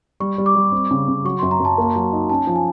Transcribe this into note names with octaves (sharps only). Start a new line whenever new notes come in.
G3 C#6
G3
D6
G3
C4
C#3
C#3
F#3 C#6
F#2 C6
A#5
F#2 A5
A#3
F#3
D#4
C#4 A5
F3
G#5